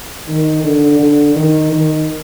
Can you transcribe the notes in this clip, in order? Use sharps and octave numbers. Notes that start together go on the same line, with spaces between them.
D#3
D3
D3
D#3
D#3